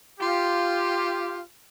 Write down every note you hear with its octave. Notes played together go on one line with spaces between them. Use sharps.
F4 G4